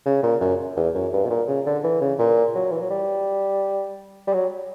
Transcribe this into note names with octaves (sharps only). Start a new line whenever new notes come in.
C#3
A#2
F#2
E2
F#2
G2
B2
A#2
C#3
D3
E3
C#3
A#2
F#3
E3
F#3
G3
G3
F#3